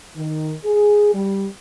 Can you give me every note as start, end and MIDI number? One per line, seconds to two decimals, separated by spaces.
0.16 0.53 51
0.63 1.10 68
1.13 1.44 55